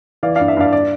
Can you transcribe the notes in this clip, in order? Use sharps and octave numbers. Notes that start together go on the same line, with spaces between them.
E3 D5 F5
G2 D5 F5
E5
G2 D5 F5
D5